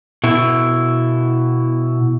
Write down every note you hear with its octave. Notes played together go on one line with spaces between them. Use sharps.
B2 E4